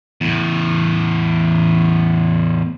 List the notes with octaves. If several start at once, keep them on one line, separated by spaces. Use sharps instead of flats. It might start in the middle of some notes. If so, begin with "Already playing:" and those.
E2 A2